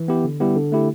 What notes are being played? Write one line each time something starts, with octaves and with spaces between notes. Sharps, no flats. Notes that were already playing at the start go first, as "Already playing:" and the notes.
Already playing: E3
B3 E4 G4
D3
G3 B3 E4 G4
D3
A3 E4 G4